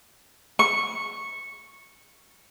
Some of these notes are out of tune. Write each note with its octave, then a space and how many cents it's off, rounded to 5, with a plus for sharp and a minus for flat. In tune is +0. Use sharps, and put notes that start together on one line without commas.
C#6 -10